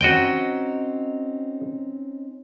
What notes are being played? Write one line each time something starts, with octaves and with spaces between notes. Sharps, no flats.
C4 C#4 D#4 F#4 D#5 G5